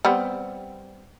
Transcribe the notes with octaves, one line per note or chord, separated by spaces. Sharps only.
G3 B3 C4